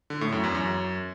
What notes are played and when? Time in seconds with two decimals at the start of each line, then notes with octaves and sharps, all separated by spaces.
0.10 D3
0.21 A2
0.32 F#2
0.44 E2
0.55 F#2